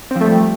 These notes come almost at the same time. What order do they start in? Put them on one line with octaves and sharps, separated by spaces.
C4 F3 A3 G3